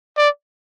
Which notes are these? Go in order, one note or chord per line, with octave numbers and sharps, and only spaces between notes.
D5